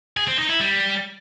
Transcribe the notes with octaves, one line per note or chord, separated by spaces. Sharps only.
G#4
C4
D#4
E4
G3